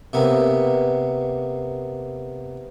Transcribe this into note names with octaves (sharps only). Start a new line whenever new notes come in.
C3 A#3 B3